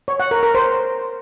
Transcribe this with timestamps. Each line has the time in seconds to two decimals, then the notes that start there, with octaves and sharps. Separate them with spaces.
0.08 C#5
0.20 F#5
0.31 A#4
0.43 A#4
0.55 C5